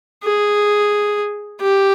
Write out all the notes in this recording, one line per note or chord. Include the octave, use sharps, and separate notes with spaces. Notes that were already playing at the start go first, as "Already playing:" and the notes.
G#4
G4